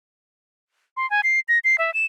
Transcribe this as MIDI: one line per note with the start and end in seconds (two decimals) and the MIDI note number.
0.97 1.09 84
1.10 1.21 80
1.23 1.40 96
1.48 1.59 94
1.64 1.76 96
1.78 1.93 76
1.94 2.05 100